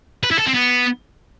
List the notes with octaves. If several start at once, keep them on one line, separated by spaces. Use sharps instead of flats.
B4
E4
A4
C4
B3